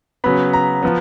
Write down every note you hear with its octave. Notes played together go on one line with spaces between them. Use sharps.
C#3 F#3 B3 B5
A#5
F3 B3